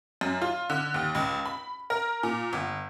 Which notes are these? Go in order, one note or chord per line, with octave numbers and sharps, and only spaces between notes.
F#2
F4
D3
D#2
C#2
B5
A#4
A#2
G1